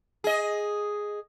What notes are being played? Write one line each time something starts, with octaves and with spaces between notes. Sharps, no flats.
G#4 D#5